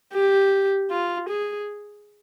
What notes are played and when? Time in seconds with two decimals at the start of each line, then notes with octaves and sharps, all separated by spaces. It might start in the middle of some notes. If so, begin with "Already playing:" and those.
0.13 G4
0.91 F4
1.30 G#4